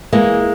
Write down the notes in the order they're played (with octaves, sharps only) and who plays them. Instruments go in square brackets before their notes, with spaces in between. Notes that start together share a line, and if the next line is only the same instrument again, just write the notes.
[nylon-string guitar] E3 G#3 A#3